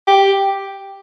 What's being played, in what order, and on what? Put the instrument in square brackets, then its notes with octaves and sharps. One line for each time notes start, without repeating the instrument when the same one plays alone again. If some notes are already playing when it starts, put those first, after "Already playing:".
[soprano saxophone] G4